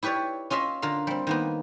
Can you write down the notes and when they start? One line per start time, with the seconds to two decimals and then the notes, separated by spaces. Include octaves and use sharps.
0.03 E4 G4 B4 C#5 D5
0.50 C#4 F4 D#5 E5 C6
0.82 D3 F4 A#4 F5
1.07 G3 C4
1.27 D#3 A#3 B3